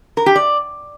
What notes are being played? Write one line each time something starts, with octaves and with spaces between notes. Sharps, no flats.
A#4
G4
D5